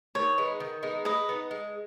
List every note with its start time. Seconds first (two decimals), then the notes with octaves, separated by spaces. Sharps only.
0.15 D#3 C#5
0.38 G#3 B3 D#4
0.60 D#3
0.83 G#3 B3 D#4
1.05 G#3 B4 D#5
1.29 B3 D#4
1.51 G#3